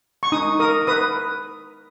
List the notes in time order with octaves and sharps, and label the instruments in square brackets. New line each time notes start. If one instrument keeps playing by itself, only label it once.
[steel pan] C#6
D#4 D#6
A#4 D#6
B4 D#6